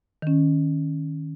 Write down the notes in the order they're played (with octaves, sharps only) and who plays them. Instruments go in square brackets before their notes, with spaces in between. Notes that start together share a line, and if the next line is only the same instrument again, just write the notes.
[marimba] D#3 C#4